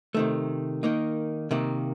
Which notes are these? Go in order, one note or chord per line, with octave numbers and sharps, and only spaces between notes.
C3 D#3 A3
D#3 A#3 D#4
C3 D#3 A#3